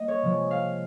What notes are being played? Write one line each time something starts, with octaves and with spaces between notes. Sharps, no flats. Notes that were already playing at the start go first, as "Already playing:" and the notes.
Already playing: G3 A#3 D#5
C#5
C3 F3 G#3
F5